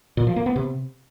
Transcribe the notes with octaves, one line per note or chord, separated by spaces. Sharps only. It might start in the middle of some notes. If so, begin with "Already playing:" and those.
A#2
F3
A#3
B3
C3